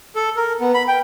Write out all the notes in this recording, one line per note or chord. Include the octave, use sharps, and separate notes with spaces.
A4
A#4
B3
B5
G5